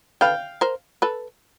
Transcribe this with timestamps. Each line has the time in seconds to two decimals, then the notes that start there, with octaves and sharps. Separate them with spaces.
0.21 A4 B4 F5 G5
0.61 A#4 C5
1.02 A4 B4